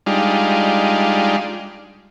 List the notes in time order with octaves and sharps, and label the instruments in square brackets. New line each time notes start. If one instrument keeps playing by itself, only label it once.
[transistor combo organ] G3 G#3 D4 D#4 F4